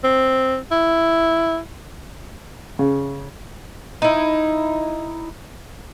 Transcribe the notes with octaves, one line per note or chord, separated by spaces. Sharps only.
C4
E4
C#3
D#4 E4